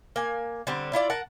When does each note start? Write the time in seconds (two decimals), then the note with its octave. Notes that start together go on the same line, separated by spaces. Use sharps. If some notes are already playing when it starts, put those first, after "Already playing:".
0.16 A#3 G#5
0.67 D3 G3 C4
0.93 E4 F4 D5
1.10 A#4 F#5 A5